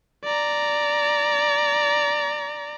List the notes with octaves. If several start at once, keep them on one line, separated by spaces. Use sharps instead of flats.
D5 A#5